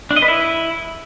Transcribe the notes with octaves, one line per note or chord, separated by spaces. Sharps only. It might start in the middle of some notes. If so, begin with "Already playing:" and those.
D4
D#5
B4
E4